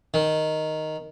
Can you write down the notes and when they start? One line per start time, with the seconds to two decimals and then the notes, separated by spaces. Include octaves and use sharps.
0.14 D#3